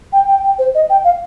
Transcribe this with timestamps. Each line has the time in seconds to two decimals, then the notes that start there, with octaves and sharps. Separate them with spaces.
0.13 G5
0.28 G5
0.44 G5
0.59 C5
0.75 D#5
0.90 G5
1.05 F5